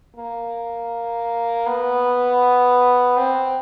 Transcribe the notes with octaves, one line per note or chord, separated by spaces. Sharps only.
A#3
B3
C4